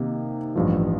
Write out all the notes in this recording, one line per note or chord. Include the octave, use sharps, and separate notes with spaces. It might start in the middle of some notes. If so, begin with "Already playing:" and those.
Already playing: C3 D#3 A#3 D#4
A1 G2 F3